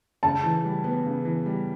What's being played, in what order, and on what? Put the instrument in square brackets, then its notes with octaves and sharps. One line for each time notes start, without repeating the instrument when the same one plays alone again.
[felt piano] C#3 [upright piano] A5
[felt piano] E3
G3
B3
C#3
E3
G3